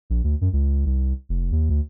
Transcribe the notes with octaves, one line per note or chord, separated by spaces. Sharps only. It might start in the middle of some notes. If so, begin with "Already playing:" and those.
A#1
D2
F#2
C#2
C2
F1
D#2
D2